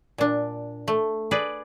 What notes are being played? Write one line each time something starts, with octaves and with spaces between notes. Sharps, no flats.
A#2 D4
A3
G#4 B4 D5